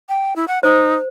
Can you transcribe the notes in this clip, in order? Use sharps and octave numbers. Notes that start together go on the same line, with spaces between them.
G5
E4
F#5
D#4 C5